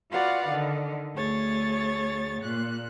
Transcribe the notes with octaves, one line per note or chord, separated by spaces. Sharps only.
F4 F#4 B4 D5 F5 F#5
D3 D#3
D2 A3 G#4 C#5 A6
A#2 F#6